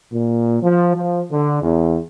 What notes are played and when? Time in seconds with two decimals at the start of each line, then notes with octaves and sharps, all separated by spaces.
0.12 A#2
0.63 F3
0.95 F3
1.31 D3
1.62 E2